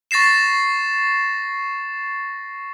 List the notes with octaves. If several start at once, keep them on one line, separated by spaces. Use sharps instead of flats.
C#6 A6 A#6 C7 E7